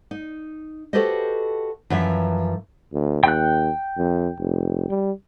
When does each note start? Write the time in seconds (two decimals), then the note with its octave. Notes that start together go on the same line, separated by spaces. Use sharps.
0.11 D#4
0.93 F#4 G4 A4 B4 C5 D#5
1.90 F#2 E3 F3 E5
2.93 D2
3.24 D#2 G5 F#6
3.98 F2
4.39 F1
4.90 G3